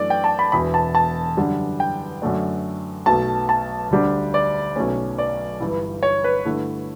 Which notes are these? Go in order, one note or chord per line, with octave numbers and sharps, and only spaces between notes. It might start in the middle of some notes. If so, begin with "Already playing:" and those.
Already playing: F#2 E3 A3 D4 D5
G5
A5
B5
E1 E2 B2 B5
A5
A5
F#2 D3 G3 D4
G5
F#2 D3 A3 D4
B1 B2 A3 A5
A5
D2 D3 G3 D4
D5
B1 B2 A3 C#4
D5
G1 G2 E3
C#5
B4
G2 D3 A3 E4